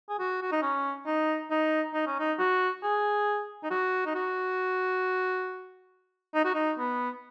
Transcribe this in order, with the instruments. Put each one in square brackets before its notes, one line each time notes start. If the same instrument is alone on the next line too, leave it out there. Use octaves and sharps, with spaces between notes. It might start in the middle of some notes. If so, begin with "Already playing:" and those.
[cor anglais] G#4
F#4
F#4
D#4
C#4
D#4
D#4
D#4
C#4
D#4
F#4
G#4
D#4
F#4
D#4
F#4
D#4
F#4
D#4
B3